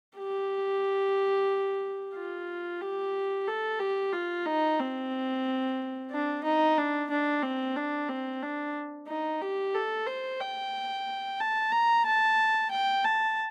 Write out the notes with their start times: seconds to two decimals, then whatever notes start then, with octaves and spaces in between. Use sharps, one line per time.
0.17 G4
2.15 F4
2.81 G4
3.48 A4
3.79 G4
4.12 F4
4.46 D#4
4.80 C4
6.11 D4
6.44 D#4
6.78 D4
7.10 D4
7.43 C4
7.76 D4
8.09 C4
8.42 D4
9.08 D#4
9.41 G4
9.75 A4
10.07 C5
10.40 G5
11.40 A5
11.72 A#5
12.06 A5
12.71 G5
13.04 A5